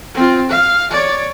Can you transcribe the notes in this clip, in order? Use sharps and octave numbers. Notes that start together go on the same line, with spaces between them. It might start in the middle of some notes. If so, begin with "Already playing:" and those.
C4 F4
F5
C#5 D5